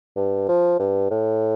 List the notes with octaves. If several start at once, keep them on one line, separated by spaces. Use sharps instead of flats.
G2
F3
G2
A2